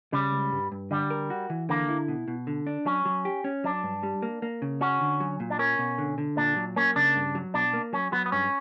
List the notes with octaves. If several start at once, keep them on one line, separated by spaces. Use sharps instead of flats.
C#3 G3
C#2
G2
G2
D3 G3
A#4
F#4
E3
D3 A#3
E4
B2
B2
D3
D4
F#3 C#4
F#3
G4
C#4
F#3 D4
G2
G3
A#3
A#3
C#3
C#4 F#4
D3
F#3
A#2
D4
C#4 A#4
B2
D3
D3
A#2 D4
F#3
A#3 C#4
C#3 D4
G2
F#3
B2 D4
A#3
F#3 C#4
F#3 B3
B3
G2 C#4